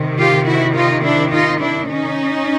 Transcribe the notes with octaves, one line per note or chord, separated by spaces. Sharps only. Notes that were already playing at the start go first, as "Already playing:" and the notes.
Already playing: C3 D#3
F4 G4
E4 F#4
D#4 F4
D4 E4
D#4 F4
D4 E4
C#4 D#4